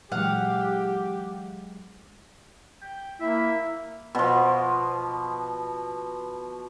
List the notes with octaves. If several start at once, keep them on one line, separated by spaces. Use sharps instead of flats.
A#2 E3 F#3 G#3 G4 F5 F#5
G5
A#3 E4 E5
B2 F3